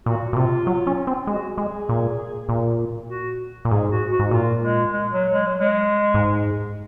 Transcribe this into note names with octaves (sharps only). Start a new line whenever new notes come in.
A#2 F#4
A#2
C3 F4
F#3
C#4
C4
G#3 F#4
G#3 G#4
A#2
A#2
F#4
A#2
G#2 G#4
F#4
F#4
G#2
A#2 F4
G#3
G#3
F#3
G#3
F#3
G#3
G#2